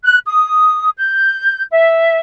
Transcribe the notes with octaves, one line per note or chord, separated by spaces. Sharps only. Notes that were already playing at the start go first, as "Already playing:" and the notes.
F#6
D#6
G6
E5